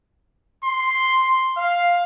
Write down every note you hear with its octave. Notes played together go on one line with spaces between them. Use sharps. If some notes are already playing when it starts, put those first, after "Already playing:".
C6
F5